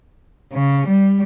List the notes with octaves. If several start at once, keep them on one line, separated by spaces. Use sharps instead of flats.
C#3
G3